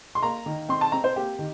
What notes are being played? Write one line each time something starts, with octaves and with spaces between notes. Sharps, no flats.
C6
A#3 A#5
D#3
C4 C6
A5
C4 A#5
C5
A#3 G4
D#3